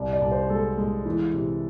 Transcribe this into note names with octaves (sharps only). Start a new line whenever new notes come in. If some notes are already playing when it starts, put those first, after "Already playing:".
Already playing: C2 D5
D5
C2
C5
G#3 A4
G#3
E3
C3